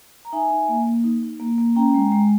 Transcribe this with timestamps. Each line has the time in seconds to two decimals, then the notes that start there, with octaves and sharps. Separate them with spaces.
0.25 A#5
0.32 D#4 E5 G#5
0.51 D#4
0.69 A#3
0.86 A#3
1.04 D#4
1.23 D#4
1.40 A#3
1.58 A#3
1.75 C#4 G5 A#5
1.94 G#3
2.12 G#3